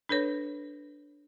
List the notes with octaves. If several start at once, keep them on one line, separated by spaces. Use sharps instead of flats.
D4 A4 B4 C#5